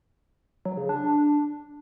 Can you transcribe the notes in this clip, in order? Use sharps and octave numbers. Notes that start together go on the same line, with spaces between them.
F#3
C#3
D4